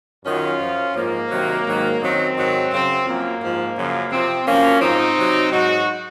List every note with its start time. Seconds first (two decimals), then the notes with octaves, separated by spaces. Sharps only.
0.25 F#2 D#3 F#3 C#4 F4
0.60 F#2 F3
0.95 G#2 F3 A#3
1.31 C3 D#3 F#3
1.66 G#2 D#3 F#3
2.01 F#2 D#3 F#3 C4
2.36 G#2 D#3 F#3
2.71 F#2 C#3 F#3 C4
3.06 F#2 F3 A#3
3.41 G#2 F3
3.76 F#2 C#3 F3
4.12 C3 F3 C4
4.47 F#2 F3 A#3 C#4
4.82 G#2 F3 C4 D#4
5.17 C3 F#3
5.52 G#2 F#3 D#4 F#4